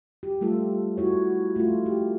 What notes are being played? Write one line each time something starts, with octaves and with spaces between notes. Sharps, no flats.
G4
G3 A3 F4 A4
E4 F#4 C#5
A3 F4
G4